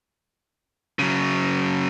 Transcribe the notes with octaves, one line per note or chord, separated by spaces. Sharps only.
C#3 F#3